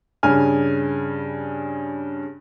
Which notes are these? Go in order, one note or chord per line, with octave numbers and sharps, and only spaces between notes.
G2 C#3 G#5 F6